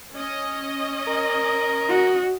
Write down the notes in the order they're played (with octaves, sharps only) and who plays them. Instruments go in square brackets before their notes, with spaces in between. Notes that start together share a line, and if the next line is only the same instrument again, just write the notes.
[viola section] C#4 D#5
[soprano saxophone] A#4
[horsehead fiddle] F#4